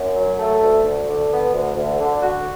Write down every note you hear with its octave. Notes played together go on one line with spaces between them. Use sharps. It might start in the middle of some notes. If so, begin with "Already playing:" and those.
Already playing: F#2
F#3
A3
D2
D2
D3
B3
D2
D2
D3
F#4